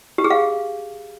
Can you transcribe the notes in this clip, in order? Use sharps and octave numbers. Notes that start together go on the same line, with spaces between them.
G4
G#4
F5